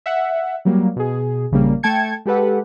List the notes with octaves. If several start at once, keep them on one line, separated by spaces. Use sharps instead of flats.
E5 F#5
F#3 G3 A#3
B2 G#4
A#1 C#3 G3 A#3
A3 G5 A5 G#6 C#7
G#3 G4 A4 B4 F#5